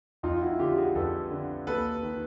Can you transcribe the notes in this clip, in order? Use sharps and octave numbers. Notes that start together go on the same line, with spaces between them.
F2 D#4 F4
E4 F#4
D3 F4 G4
F#4 G#4
F2 A4 B4
D3
D#2 A4 B4
D#3